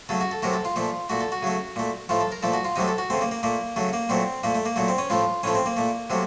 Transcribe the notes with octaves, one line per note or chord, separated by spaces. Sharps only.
C#3 F#3 A3 A4
F#4
A4
C3 F#3 A3 A#4
A4
F4
A#2 F3 A3
A#2 A3 F#4
A4
F#4
C#3 F#3 A3
A#2 A3
A2 F3 A3 F4
A4
A#4
A#2 F3 A3 A4
F#4
F4
C3 F#3 A3 D#4
A4
F#4
C#3 A3 C4
A#3
A#3
A#2 A3 A#3
C#3 F#3 A3
A#3
A#2 F#3 A3 C4
A#2 A3 A#3
A3
A#3
A#2 F#3 A3
C4
C#4
A2 F3 A3 F4
A2 F3 A3 C#4
C4
A#3
A#2 A3
C3 F#3 A3